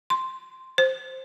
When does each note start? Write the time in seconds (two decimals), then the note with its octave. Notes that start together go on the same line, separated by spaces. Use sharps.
0.10 C6
0.78 C5